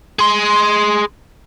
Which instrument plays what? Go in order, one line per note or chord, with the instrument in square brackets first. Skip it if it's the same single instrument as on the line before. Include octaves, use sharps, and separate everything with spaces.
[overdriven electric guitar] G#4 C6